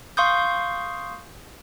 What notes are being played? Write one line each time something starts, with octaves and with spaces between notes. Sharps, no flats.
F5 C6 C#6 D#6 G6